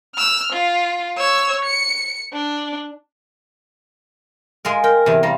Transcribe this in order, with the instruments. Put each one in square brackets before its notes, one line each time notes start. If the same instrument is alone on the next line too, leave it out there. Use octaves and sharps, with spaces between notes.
[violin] E6 F6
F4
C#5 E6
C#7
D4
[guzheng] G#3 F4 A#4
[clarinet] A#4 [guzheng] G5
[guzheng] E2 C3
[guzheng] G3 F4 [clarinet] A#5